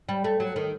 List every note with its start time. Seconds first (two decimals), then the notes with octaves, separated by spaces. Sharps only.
0.09 G3
0.24 A3
0.40 F#3
0.56 D#3